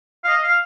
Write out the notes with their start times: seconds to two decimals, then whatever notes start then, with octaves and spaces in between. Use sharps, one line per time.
0.24 F5
0.28 D#5
0.43 F5